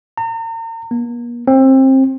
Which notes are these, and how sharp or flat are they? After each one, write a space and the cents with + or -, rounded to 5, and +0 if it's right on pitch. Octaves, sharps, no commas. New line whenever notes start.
A#5 -40
A#3 +40
C4 +25